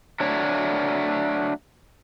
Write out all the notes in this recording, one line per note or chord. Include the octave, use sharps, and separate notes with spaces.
F#3 A3 D4 C#5